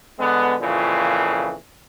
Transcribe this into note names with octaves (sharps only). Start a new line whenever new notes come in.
D3 G#3 B3
F2 A#2 C#3 E3